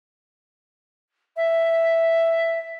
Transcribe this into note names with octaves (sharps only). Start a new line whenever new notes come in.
E5